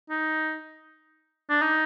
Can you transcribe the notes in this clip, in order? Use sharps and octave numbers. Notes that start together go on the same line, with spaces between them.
D#4
D4
D#4